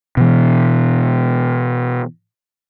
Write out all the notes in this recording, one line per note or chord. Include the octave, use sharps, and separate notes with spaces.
B2 E3